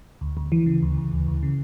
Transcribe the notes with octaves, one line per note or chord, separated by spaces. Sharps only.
D2
D2
E3
C#3
D2
D2
D2
D2
C#3